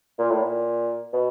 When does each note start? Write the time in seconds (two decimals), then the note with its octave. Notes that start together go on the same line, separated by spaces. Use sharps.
0.19 A#2
0.30 A2
0.42 A#2
1.13 B2